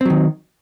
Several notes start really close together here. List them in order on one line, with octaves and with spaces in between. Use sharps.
C4 F#3 D#3